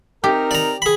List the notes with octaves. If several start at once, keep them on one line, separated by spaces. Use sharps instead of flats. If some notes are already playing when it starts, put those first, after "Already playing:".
C4 D#4 G4 A#4
D5 A#5
G#4 B5